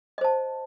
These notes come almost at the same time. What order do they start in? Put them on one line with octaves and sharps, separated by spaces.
D#5 C5 A5